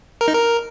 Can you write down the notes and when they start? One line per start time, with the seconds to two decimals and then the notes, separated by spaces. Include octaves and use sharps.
0.21 A#4
0.28 D#4
0.35 A#4